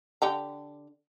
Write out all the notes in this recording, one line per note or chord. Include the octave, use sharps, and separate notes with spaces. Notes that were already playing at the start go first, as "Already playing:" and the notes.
D3 G4 A#5